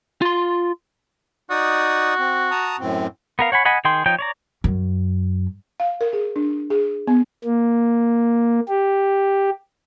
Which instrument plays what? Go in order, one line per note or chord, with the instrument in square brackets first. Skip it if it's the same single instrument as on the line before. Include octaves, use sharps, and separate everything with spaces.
[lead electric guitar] F4 C6
[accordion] D#4 D5 D#6 [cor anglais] F#4
[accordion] C4
A5 A#5 D#6
F#2 A2 C4
[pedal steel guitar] B3 A#4 F5
C#5 F#5 G#5 B5
D#5 F#5 G#5 B5
D#3 G#4 G5 C6
F3 D#4 C#5 G5 G6
C#5 D5 A#5
[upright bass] F#2
[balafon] F5
A#4
G#4
D4
G#4
B3
[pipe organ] A#3
G4